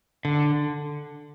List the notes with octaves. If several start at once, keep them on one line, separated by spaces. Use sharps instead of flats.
D3